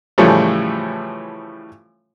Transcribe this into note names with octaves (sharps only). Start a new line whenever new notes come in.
A2 C#3 E3 F3 G3 A3